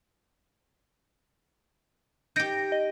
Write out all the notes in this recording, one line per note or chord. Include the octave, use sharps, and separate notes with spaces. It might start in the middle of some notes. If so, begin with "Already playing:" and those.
D#4 G4 G6 A#6 D7
D#5